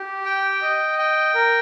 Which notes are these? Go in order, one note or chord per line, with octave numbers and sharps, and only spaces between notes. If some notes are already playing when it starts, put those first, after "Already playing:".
Already playing: G4
G5
D#5
G5
A#4